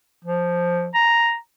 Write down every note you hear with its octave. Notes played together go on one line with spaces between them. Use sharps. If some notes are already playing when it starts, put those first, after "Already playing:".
F3
A#5